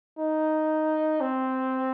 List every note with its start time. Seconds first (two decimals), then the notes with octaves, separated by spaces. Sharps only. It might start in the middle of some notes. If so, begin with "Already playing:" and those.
0.19 D#4
1.21 C4